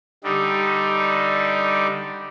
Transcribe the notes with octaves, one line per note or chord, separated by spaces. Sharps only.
D3 G3 D#4